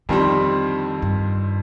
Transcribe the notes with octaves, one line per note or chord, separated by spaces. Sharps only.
F2 D3 D#3 G3 C4
G2